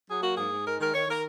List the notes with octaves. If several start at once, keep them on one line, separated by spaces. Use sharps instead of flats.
F#3 G#4
A#3 F#4
G#2 G#4
G#2
G#3 A#4
D#3 A#4
D#3 C#5
D#3 A#4